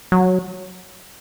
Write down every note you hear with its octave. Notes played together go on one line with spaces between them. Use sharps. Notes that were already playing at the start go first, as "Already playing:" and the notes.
F#3